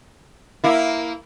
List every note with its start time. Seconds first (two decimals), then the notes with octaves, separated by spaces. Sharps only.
0.64 A#3 E4